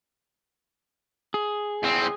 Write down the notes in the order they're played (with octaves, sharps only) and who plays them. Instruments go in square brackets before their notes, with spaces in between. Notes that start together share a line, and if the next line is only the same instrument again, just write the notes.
[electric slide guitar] G#4
[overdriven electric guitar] E2 C4